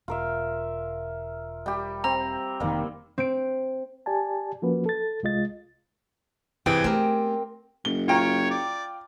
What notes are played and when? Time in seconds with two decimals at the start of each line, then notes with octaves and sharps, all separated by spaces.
0.08 E1 F4 A#4 E5
1.66 G3 G4
2.04 C4 A#5
2.60 F1 B2 D#3 G3 A#3
3.18 C4 D7
4.06 G4 D5 G#5 A5
4.62 F3 A#3 C#4 F#4 B4
4.86 A4 A6
5.23 C2 G#3 F4 D#5 A6
6.66 G2 C3 E3 G#4 D5 G5
6.84 A3 B3 C4 G4 A#4
7.85 F#1 G7
8.08 F4 C#5 G5 A#5
8.51 D5